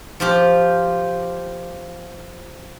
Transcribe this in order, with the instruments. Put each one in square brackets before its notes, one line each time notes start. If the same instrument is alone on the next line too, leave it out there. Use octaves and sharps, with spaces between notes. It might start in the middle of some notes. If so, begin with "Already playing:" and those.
[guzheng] F3 F4 G4